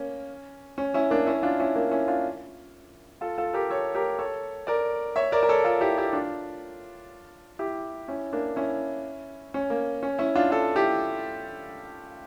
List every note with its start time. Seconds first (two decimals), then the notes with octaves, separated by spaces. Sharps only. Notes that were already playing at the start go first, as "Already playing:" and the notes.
Already playing: A#3 C#4
0.78 C#4
0.94 C#4 E4
1.10 A#3 D4
1.26 C#4 E4
1.43 D4 F4
1.60 C#4 E4
1.75 A#3 D4
1.91 C#4 E4
2.08 D4 F4
3.21 F4 A4
3.38 F4 A4
3.53 G4 A#4
3.70 A4 C#5
3.95 G4 A#4
4.19 A4 C#5
4.67 A#4 D5
5.16 C#5 E5
5.32 A#4 D5
5.43 A#4
5.49 A4 C#5
5.64 F4 A4
5.81 E4 G4
5.98 E4 G4
6.13 D4 F4
7.59 E4 G4
8.08 C#4 E4
8.33 A#3 D4
8.56 C#4 E4
9.54 C#4
9.70 A#3
10.03 C#4
10.18 C#4 E4
10.35 D4 F4
10.51 F4 A4
10.76 E4 G4